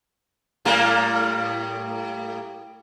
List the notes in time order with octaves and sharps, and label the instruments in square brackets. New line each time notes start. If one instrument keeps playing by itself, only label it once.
[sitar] A2 G3 A#3